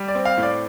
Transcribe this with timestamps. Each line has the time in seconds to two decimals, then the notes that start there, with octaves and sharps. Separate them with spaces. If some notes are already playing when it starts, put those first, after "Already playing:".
Already playing: G3
0.08 D5
0.15 C4
0.25 F5
0.37 A2
0.43 D5